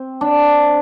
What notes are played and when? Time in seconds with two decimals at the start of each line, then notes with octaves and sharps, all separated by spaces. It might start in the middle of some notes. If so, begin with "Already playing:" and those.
Already playing: C4
0.21 D4